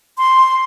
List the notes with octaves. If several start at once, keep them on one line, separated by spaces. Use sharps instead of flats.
C6